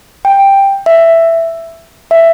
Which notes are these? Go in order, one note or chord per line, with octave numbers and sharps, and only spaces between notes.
G5
E5
E5